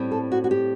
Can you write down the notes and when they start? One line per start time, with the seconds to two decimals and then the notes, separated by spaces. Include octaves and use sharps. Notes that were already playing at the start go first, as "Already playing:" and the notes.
Already playing: A2 G3 C4
0.12 A4
0.32 F#4
0.44 F#4
0.51 G4